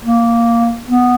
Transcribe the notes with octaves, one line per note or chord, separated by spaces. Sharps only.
A#3
B3